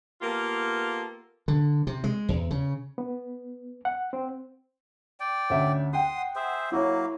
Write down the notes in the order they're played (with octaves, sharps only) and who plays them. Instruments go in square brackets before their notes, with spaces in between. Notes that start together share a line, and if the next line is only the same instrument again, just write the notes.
[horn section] A#3 B3 F4 G4 A4
[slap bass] D3
C3
G#3
E2
C#3
[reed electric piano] B3
F#5
C4
[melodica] D5 G5
[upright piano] D2 C#4 E5
[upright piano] F#5 G5 [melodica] C6 D#6
[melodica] G#4 C5 E5
[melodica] F#3 A#3 [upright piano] E4 C#5